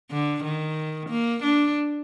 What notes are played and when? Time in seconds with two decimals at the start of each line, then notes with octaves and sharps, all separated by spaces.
0.11 D3
0.44 D#3
1.09 A#3
1.42 D4